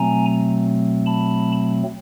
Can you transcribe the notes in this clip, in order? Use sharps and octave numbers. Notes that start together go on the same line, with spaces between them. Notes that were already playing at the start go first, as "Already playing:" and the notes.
Already playing: B2 F#3 A3 C4 G#5 A#5
A5 B5